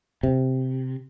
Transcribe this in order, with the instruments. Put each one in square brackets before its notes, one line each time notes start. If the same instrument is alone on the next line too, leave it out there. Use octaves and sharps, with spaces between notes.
[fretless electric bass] C3